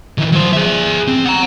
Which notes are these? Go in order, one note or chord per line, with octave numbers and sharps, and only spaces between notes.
D#3 E3
F#3 C5
G#4 E5
C4
F#5 A#5